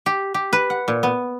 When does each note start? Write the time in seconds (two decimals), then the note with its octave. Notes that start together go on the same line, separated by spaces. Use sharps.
0.06 G4
0.34 G4
0.53 B4
0.70 F#5
0.88 A#2
1.03 B3